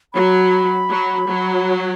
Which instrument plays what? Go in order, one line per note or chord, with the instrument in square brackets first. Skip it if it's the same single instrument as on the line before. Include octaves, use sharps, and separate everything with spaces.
[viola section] F#3 [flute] B5
[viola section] F#3
F#3